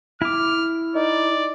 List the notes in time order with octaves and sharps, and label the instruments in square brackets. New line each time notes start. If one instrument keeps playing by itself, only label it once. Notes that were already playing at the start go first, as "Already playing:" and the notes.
[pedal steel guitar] E4 D6 [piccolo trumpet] F6
[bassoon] D#4 [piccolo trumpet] D5